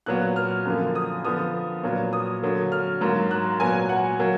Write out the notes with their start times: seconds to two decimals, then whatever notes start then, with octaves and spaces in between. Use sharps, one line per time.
0.06 A#2 F#3 B3 F#6
0.36 F6
0.65 F#2 D3 F3 A#3
0.95 D#6
1.24 D3 F3 B3 D#6
1.83 A#2 F#3 B3
2.13 D#6
2.42 D3 F#3 A#3
2.72 F6
3.01 G#2 F#3 A#3
3.31 F#6
3.60 A#2 F#3 B3 G#5
3.89 F#5
4.19 F#3 A#3